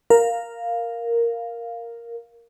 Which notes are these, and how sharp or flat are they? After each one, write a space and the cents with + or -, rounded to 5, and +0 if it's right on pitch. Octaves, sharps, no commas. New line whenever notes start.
A#4 +0 F5 +0